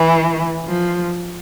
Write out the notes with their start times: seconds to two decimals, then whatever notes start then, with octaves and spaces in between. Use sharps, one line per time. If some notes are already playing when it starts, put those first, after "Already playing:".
Already playing: E3
0.68 F3